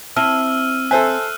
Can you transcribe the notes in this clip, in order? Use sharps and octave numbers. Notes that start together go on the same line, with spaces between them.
C4 E4 A5 E6 F6 D#7
A4 C5 E5 G#5 E6 F#6